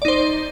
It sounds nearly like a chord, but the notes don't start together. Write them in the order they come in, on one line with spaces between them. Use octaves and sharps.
D5 D#4 C5